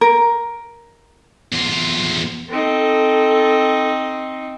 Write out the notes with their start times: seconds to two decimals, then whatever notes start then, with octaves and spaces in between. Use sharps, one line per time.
0.01 A#4
1.53 E2 F4
2.49 C4 D#4 A4